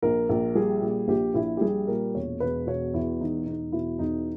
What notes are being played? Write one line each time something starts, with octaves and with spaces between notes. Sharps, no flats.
A#1 A#4
A#1
G3 G#4
A#2
A#1 G4
A#1 E4
G4
G3 G#4
A#2 A#4
E1 C#5
E1 B4
B2 C#5
E2 E4
E1 D#4
E1 D#4
B2 E4
E2 D#4